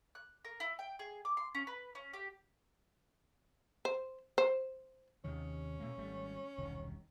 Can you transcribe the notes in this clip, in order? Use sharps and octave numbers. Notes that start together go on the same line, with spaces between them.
F#6
A#4
E4
G5
G#4
D6
C6
C#4
B4
C#4
G4
C5
C5
D#2 C3 D#3 C#4
B2 A3 A#3
G#1 G3 A3
E1 C2 D#3